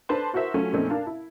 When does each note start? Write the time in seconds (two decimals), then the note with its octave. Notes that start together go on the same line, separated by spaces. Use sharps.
0.09 D4 A4 B4 C5 A5 C6
0.33 E4 F#4 A#4 C5 E5
0.54 F#3 A3 C#4 F4 F#4
0.73 F2 A#2 A3 C4 C#4 D#4
0.90 D4 A#4 F5 A5
1.07 E4